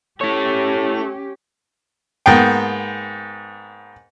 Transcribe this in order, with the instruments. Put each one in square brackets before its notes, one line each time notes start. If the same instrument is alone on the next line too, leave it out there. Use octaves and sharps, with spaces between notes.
[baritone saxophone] A3 [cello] C#4 G4 [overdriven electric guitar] E4 C#5
[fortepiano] G#2 A#3 B3 G5